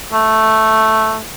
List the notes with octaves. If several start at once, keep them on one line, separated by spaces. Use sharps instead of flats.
A3